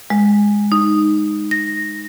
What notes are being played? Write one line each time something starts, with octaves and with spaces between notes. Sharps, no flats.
G#3
D#4
A#6